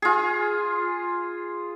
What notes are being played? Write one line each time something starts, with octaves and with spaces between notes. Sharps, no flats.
F4 G#4